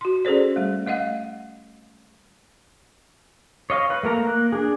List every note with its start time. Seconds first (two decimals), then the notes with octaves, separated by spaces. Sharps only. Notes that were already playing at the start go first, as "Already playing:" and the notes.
0.01 F#4 C6
0.25 C#4 G#4 A4 C5 D5
0.56 G3 A3
0.87 A3 D#5 F5 F#5
3.70 C#5 D#5 F5
3.90 B4
4.03 A3 A#3 A#4 A#5
4.27 A#3 F#6
4.52 D4 G#4